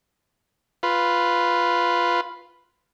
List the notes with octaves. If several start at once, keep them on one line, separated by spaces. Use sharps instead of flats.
F4 B4